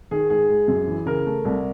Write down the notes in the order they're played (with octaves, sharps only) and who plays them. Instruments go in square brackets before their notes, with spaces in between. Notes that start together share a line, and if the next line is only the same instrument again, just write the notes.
[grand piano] D#3 G#4
G#2 G#4
G#3
F#2
E3
C#3 A#4
A3
C2